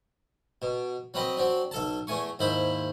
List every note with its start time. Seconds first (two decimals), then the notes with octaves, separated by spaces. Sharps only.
0.62 B2
1.14 F#3 C4 B4 D#5
1.37 F#3 C4 D4
1.71 B1 A4 A5
2.07 E2 A3 G#5 C#6
2.39 D#2 G#2 E4 C5 B5